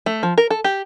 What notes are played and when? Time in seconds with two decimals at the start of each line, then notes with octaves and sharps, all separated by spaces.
0.06 A3
0.23 F3
0.38 A#4
0.50 A4
0.64 G4